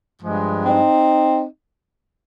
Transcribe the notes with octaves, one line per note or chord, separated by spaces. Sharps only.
G2 F3 G#3
C4 D#4